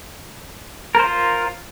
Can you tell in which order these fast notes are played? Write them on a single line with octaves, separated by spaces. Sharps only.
A#4 C5 F4